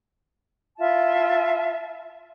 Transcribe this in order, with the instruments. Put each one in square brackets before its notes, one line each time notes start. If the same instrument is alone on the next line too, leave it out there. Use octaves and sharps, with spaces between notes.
[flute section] E4 F4 E5 A5